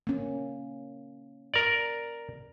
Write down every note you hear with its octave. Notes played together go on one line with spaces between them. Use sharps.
A#3 C#4
A#4 D5